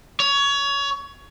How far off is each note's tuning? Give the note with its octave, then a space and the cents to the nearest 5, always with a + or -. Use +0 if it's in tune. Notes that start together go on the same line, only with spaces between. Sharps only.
C#5 +20